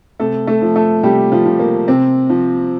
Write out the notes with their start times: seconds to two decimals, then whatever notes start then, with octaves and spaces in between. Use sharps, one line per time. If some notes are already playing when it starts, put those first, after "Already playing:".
0.20 C3 A3 A4
0.47 A3 A4
0.62 F3
0.76 A3 A4
1.03 C3 G3 G4
1.32 F3 F4
1.45 F3
1.59 A#3
1.88 C3 C4
2.30 F3